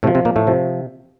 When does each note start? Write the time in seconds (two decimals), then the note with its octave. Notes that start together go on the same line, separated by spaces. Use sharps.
0.03 A2 C3 A3
0.07 F3
0.15 C3 C4
0.25 A#2 A#3
0.36 A2 A3
0.47 C3 F3